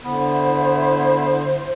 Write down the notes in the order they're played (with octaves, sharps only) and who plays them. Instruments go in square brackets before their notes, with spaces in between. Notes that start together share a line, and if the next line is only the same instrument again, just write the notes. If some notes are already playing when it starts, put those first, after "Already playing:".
[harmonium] D3 [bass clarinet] B3 [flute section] E4 C5